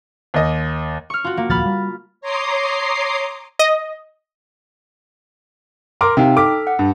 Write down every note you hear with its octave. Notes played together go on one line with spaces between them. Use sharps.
D#2 D#5
C#6 F6
F4 F#4
A#3
D#1 C#2 F3 B5 F6 A6
G3
C#5 A#5 C6 D6 D#6 C7
D#5
A#4 C6 D6
C3 D#4 F5 G5
A4 D6 F6 B6
F#5
G2